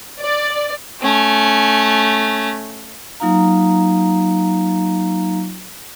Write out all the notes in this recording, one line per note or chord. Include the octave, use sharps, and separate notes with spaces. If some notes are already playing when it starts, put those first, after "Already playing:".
D5
A3 C#4
F#3 A#3 D#4 F4 F5 A#5